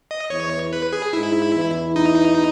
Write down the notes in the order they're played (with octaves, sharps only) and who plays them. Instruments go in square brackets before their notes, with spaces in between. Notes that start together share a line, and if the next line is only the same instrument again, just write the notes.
[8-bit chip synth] D#5
[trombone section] E2 E3 [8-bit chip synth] C#5
[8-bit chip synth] B4
G#4
[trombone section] G#2 G#3 [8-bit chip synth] E4
[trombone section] E2 E3
[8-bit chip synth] D#4